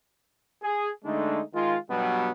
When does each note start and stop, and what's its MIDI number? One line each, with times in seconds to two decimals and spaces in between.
0.63 0.89 68
1.05 1.41 50
1.05 1.41 56
1.05 1.41 57
1.05 1.41 62
1.05 1.41 63
1.54 1.77 51
1.54 1.77 56
1.54 1.77 65
1.90 2.30 43
1.90 2.30 47
1.90 2.30 54
1.90 2.30 55
1.90 2.30 59